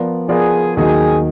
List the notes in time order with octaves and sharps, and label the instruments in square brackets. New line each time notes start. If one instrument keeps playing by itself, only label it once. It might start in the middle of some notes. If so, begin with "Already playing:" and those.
Already playing: [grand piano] F3 B3 F4 A#4 D5
[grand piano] F3 B3 F4 A#4 D5 [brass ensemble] G#4
[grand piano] D#2 D#3 F#3 [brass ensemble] G#4